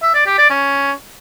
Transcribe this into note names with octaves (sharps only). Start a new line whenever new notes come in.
E5
D5
G4
D5
C#4